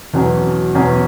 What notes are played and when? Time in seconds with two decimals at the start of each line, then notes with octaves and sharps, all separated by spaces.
0.13 E2 B2 F#3 C#4
0.75 E2 B2 F#3 C#4